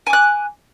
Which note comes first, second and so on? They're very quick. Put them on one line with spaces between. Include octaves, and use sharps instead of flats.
G#5 D6 F#6